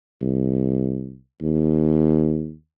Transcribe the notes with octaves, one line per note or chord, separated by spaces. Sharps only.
C2
D#2